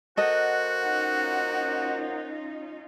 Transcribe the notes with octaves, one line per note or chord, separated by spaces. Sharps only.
A#3 F#4 A4 C5 D#5 F#5
C#4 D#4 F4